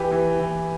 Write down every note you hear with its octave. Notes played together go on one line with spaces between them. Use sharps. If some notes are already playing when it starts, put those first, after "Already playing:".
Already playing: E3 G4 B4
E3
E3